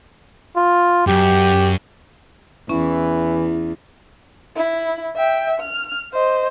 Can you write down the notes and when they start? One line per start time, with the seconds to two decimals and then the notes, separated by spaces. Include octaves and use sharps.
0.56 F4
1.07 F#2 G4
2.69 E2 E3 C#4 E4
4.56 E4
5.16 E5 G5
5.60 F6
6.13 C5 D#5